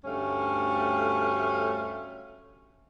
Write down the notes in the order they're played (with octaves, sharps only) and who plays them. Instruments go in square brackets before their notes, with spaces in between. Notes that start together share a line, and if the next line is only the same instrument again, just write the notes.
[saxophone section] D2 G2 A3 C#4 C#5 F5